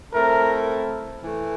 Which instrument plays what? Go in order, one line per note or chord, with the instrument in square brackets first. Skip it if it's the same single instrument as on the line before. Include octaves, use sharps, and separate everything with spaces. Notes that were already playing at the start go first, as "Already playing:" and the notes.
[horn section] A3 C4 E4 A4 [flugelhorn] A#4
[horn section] E3 A3